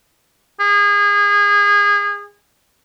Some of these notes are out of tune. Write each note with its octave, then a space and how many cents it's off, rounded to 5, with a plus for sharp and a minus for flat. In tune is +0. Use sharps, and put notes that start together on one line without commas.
G#4 -30